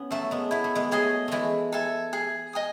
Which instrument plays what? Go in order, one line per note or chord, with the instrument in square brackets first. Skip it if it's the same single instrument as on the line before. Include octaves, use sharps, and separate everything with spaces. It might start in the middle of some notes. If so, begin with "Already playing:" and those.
Already playing: [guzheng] B3 C#4
[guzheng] F#3 A3 [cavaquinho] E5 A5 C#6
[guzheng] G#3 B3
[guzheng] B3 [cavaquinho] E4
[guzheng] A3
G#3 B3
[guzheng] F#3 A3 [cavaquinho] G#4 D#5
[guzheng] E3 G#3 A3 [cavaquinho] E4
[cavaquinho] A4 E5 G#5
G#4
D#5 G#5 D#6